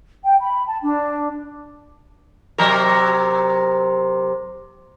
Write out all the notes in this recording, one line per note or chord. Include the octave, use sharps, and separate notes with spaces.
G5
B5
A5
D4
C3 F#3 A#4